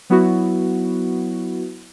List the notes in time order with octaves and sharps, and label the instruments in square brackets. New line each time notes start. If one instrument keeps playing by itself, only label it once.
[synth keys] F#3 B3 E4 F#4